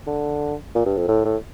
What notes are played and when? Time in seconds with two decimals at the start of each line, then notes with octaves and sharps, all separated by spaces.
0.06 D3
0.75 A#2
0.85 G2
0.97 F2
1.08 A2
1.25 A2